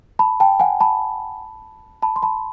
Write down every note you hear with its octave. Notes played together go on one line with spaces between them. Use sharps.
A5 B5
G5 A5
F#5 G#5
A5 B5
A5 B5
C6
A5 B5